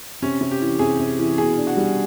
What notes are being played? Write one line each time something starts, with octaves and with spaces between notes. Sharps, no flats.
C3 C#4
C3
G4
E3
C3 G#4
C3
E3
B2 G#4
D4
F#4
G3